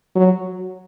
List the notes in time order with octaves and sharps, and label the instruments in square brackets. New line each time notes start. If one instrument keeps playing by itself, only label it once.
[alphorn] F#3